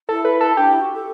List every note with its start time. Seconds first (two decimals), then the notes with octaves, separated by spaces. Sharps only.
0.09 E4 A4
0.25 B4
0.41 A4
0.57 D4 G4
0.70 E4
0.80 F#4
0.93 A4